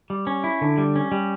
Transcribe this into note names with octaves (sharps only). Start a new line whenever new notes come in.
G3
C#4
E4
D3
G3
C#4
G3